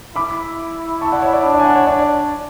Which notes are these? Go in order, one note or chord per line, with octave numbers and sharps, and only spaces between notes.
E4 B5 D6
A5 C#6
D5 F#5
C#5 E5
D5
D4 C#5
D5
G#5
D5 F#5
C#5
D4 D5